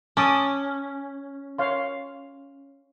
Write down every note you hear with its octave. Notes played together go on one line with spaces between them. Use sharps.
C#4 A5 D6 D#6
C#5 F5 C6